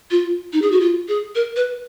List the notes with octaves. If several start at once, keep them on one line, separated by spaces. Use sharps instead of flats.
F4
D#4
G#4
F#4
F4
G#4
A#4
B4